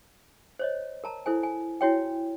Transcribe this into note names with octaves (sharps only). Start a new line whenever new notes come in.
C5 C#5 D#5
A#4 A5 A#5
E4 A4 C5 G#5
G#5
E4 F#4 C#5 G5